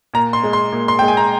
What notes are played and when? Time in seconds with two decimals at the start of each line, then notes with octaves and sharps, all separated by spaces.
0.14 A#2 A#5
0.33 C6
0.43 G#3
0.53 C6
0.72 A#2
0.88 C6
0.99 G#3 G5
1.08 G#5
1.17 A#5